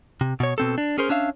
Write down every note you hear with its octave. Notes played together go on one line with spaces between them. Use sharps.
C3
B2 C#5
B2 C4 A4
D4
C#4 G#4 A#4 C5
C#4 D4 E5 F5